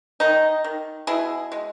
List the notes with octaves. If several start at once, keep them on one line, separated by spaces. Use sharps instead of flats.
D#3 D#4
D#3
B2 E4 G#4
G#3